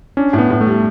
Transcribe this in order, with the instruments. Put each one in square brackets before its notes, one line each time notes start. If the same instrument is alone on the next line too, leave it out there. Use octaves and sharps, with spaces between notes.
[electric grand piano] C#4 [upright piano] D4
[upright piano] A2
[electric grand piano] B3
[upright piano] A2
[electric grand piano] A3
[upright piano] G3